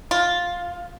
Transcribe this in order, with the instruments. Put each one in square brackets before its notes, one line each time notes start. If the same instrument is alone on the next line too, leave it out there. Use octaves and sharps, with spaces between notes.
[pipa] F4